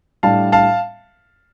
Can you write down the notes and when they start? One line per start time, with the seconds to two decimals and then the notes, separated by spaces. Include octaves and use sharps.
0.23 A2 G3 D4 F5 A5
0.52 F5 A5